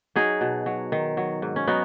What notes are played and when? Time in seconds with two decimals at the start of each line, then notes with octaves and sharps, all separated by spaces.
0.16 F#3 D#4 G#4
0.41 B2
0.66 F#3
0.92 D#3
1.17 F#3
1.42 G#2
1.56 C#4
1.67 F#3 B3 D#4